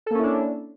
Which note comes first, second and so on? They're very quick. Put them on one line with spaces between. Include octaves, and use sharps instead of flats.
A4 A#3 C#4 E4 D4